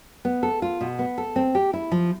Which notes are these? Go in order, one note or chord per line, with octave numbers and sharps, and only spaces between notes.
B3
A4
F4
B2
B3
A4
C4
G4
E4
F3